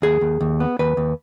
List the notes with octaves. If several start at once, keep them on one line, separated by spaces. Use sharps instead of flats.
D#2 G#4
D#2
D#2
B3
D#2 B4
D#2